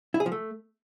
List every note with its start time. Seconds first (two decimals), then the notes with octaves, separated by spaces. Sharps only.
0.14 E4
0.20 G#4
0.26 F3
0.32 A3